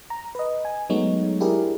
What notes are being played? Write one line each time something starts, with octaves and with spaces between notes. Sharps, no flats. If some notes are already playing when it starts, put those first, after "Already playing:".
A#5
B4 D#5
G#5
F#3 G#3 A3 B3 D#4 C#5
D4 E4 G4 G#4 A#4